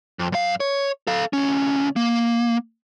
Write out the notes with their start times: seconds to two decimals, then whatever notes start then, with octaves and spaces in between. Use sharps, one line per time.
0.19 F2
0.32 F#2 F5
0.60 C#5
1.07 A4 F5
1.33 D2 C#4
1.96 A#3